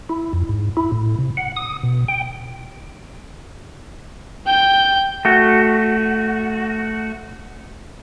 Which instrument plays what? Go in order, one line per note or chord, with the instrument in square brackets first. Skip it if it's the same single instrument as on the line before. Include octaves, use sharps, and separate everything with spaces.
[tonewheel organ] E4
F2
G#2
E4
A2
C3
F#5
D#6
B2
G5
[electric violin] G5 G6
[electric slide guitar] A3 F#4